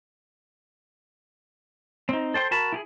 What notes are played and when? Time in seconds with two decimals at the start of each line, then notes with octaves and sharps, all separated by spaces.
2.09 C4 D#4
2.34 A4 C5 G5 C6
2.51 F#4 A#4 A5 B5
2.72 E4 G4 G#4